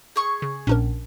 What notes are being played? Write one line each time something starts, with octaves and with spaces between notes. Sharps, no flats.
G#4 C#6
C#3
A#1 C#4 D4 A#4